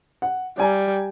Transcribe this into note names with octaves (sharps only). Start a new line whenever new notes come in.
F#5
G3 D5 G#5 A#5